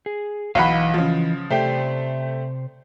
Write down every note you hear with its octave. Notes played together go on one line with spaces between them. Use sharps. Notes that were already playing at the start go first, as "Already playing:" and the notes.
G#4
B1 E3 D#5 F5 F#5 B5
C#3 F3
C3 A3 G4 C5 D5